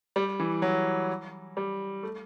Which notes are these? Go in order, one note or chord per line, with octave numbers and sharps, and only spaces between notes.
G3
E3
F#3
G3
A3